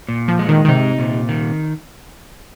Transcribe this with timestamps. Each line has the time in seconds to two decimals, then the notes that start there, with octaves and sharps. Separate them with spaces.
0.08 A#2
0.28 F3
0.39 G#3
0.49 D#3
0.65 D#3
0.69 C3 D#4
0.99 A#2
1.29 D#3